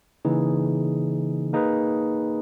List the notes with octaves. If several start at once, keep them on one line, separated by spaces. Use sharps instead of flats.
C#3 E3 A#3 D#4 G#4
A#3 D#4 G#4 B4